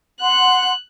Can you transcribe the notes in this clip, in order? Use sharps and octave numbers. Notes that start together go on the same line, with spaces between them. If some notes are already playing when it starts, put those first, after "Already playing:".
F#5 C6 F#6